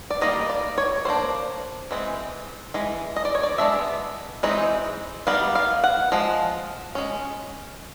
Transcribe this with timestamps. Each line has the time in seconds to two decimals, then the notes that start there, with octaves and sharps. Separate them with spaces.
0.10 D5
0.21 D#3 G3 A#3 D#5
0.50 D5
0.78 C#5
1.05 G3 A#3 D4 C5
1.91 E3 G#3 C4
2.74 E3 G#3
3.16 D#5
3.25 D5
3.35 C#5
3.43 D5
3.58 G#3 B3 D4 E5
4.43 E3 G#3 C4 D#4
5.27 D#3 G3 B3 F5
5.55 F5
5.84 F#5
6.12 F3 G#3
6.95 G#3 C#4